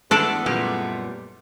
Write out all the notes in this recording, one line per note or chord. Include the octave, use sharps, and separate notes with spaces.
E3 G#3 A3 B3 D4 A4 D5
F#2 A#2 G3